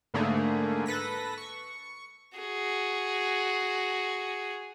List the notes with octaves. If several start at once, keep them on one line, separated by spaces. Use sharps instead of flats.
G#2 D3 A3 A#3 G#4
A4 B4 A#6 B6
C#6
F#4 G#4